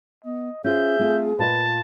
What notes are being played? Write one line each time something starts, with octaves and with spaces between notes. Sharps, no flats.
B3 D#5
C#4 F4 G#4 C5 E5 G6
A3 C4 F4
A#2 F4 B4 D#5 A5